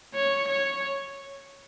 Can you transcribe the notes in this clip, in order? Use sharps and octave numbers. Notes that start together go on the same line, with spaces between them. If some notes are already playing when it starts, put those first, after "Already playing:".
C#5
C#5